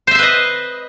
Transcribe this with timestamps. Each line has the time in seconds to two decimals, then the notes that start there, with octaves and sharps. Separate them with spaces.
0.07 C5
0.11 E5
0.15 C6
0.19 B4
0.23 D#5